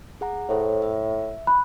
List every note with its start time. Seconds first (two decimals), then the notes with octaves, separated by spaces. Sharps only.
0.21 G#4 F#5 A#5
0.49 A2 A4 C5 C#5
0.82 E5
1.47 B5 F#6